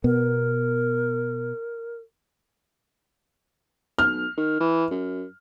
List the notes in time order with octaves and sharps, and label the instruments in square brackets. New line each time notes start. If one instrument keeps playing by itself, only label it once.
[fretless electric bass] B2 B3 [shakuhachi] A#4
[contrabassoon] B1 [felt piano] F6
[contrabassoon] D#3
E3
F#2